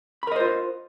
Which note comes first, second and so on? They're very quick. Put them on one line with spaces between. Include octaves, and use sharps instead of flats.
B5 A#4 D#5 C5 F4